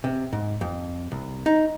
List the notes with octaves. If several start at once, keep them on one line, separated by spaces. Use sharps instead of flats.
C3
G#2
F2
C2
D#4